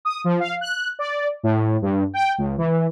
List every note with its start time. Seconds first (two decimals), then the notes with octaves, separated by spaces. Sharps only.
0.05 D#6
0.24 F3
0.40 F5
0.61 F#6
0.99 D5
1.43 A2
1.82 G2
2.14 G5
2.38 C#2
2.58 E3